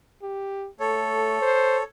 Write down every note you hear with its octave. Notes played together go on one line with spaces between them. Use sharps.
G4
A3 A4 C#5
C5